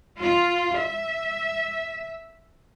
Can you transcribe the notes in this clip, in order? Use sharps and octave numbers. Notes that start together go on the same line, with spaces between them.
F4
E5